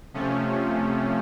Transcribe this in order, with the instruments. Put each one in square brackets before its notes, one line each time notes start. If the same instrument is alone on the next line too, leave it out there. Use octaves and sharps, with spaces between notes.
[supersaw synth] C3 F3 A3 C#4